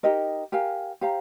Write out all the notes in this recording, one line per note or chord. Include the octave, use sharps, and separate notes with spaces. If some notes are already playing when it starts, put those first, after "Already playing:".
D#4 G4 A#4 D#5
G4 A#4 F5 G#5
G4 C5 F5 A#5